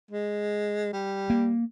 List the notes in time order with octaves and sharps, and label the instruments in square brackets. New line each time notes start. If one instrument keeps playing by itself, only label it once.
[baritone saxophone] G#3
G3
[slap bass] A#3